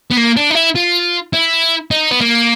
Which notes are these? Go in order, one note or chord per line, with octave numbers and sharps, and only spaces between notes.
B3
A#3
D4
D#4
E4
F4
E4
D#4
B3
A#3